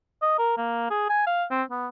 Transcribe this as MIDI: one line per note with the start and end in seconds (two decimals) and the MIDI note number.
0.22 0.37 75
0.38 0.55 70
0.57 0.90 58
0.91 1.07 68
1.09 1.27 80
1.27 1.44 77
1.51 1.63 60
1.71 1.88 59